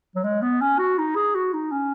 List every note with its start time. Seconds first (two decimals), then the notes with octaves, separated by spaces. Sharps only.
0.15 F#3
0.24 G#3
0.42 B3
0.61 C#4
0.79 F#4
0.98 D#4
1.15 G#4
1.35 F#4
1.53 D#4
1.72 C#4